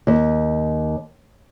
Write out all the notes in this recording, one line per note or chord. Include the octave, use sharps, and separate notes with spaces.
D#2